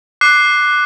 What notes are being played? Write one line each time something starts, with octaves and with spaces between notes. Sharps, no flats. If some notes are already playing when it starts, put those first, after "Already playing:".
D6 F#6 C7